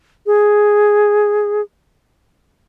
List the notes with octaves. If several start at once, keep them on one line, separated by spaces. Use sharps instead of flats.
G#4